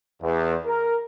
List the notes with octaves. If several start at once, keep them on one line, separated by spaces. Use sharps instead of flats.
E2
A#4